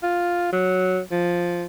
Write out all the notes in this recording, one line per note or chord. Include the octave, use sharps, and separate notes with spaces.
F4
F#3
F3